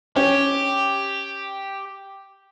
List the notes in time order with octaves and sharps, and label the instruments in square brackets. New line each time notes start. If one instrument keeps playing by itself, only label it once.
[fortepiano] C#4 [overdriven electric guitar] G4